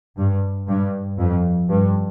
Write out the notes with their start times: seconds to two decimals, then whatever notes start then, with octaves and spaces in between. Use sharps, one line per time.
0.18 G2
0.68 G2
1.19 F2
1.70 G2